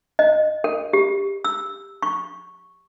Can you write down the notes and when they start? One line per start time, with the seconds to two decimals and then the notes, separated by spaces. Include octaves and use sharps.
0.19 D#5
0.64 A#4
0.93 G4
1.45 E6
2.03 C#6